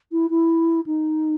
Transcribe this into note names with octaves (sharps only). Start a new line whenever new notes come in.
E4
E4
D#4